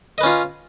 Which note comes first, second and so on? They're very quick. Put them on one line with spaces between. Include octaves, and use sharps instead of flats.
D#5 B4 C#4 F4